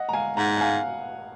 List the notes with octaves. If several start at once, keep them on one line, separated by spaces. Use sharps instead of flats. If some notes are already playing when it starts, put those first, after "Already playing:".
Already playing: D#5 F#5
A#5
F5 G#5
G#2 F#5 A#5
F#5
F5 G#5